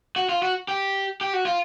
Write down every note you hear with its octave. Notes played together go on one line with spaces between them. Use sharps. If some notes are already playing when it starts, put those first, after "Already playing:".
F#4
F4
F#4
G4
G4
F#4
F4